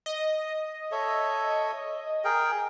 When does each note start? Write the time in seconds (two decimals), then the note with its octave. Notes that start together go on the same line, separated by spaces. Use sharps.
0.06 D#5
0.92 A4 C#5 E5
2.24 G#4 A#4 G5